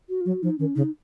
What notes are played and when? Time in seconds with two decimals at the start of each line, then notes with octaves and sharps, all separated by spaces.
0.09 F#4
0.21 F4
0.26 F#3 F#4
0.42 F3 D#4
0.58 D#3 C#4
0.75 C#3 D#4